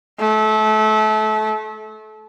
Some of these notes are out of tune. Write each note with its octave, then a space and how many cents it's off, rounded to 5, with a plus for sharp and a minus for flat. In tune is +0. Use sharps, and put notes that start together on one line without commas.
A3 -30